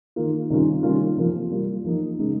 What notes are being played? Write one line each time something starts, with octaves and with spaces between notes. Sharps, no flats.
D#3 A#3 F4
C3 D#3 G3 C#4 F4
D#3 G3 A#3 C#4 F4
C3 F3 A#3 F4
G3 A#3 F4
F3 A#3 D#4
C#3 G#3 D#4